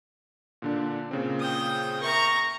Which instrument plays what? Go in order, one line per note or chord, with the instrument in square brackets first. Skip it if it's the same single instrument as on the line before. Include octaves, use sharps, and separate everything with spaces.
[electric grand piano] A#2 D3 D4
A#2 C#3 C4
[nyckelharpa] G5 D#6
[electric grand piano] A#4 E5 [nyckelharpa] A#5 C#6